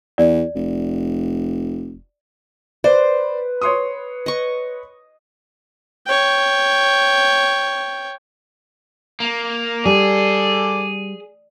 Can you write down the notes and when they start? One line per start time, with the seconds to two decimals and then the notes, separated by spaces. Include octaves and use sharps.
0.18 E2 D5
0.55 F1
2.84 B4 C5 D5
3.61 C#5 C6 D#6
4.26 D#5 C#6
6.06 C#5 G5
9.20 A#3
9.85 G3 G#4 A4 D5